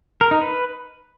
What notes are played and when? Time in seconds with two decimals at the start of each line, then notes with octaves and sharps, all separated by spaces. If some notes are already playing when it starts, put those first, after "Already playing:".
0.21 A#4
0.31 D#4
0.41 B4